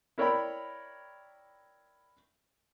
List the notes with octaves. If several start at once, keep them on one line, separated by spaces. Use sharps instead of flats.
E4 A#4 C#5 D5 G5 B5